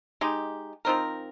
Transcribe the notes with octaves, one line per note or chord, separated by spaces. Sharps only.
G#3 D#4 G4
F3 C4 D#4 A#4